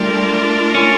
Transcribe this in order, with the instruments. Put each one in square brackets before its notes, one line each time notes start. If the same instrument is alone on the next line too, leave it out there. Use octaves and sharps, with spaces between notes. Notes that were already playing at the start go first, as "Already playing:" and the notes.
Already playing: [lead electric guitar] G3 [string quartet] A3 D4 F4 A#4 D5
[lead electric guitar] C#4